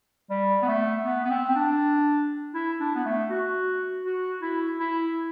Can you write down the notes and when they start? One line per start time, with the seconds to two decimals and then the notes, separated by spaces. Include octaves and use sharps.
0.30 G3
0.62 B3
0.68 A3
1.05 B3
1.25 B3
1.30 C4
1.50 C4
1.56 D4
2.55 E4
2.80 D4
2.95 B3
3.06 A3
3.30 F#4
4.05 F#4
4.42 E4
4.80 E4